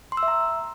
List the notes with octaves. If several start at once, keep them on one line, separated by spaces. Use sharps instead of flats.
C6
E6
E5
A#5